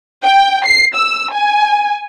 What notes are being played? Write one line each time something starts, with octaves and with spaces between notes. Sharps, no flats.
G5
C7
E6
G#5